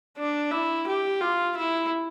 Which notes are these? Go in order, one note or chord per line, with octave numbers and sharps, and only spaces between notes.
D4
E4
G4
F4
E4